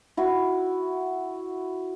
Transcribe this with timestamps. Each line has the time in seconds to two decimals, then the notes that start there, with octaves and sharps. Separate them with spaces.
0.17 E4 F#4